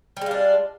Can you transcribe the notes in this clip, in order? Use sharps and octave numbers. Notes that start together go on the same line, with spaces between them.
G3 G#3 D4 F4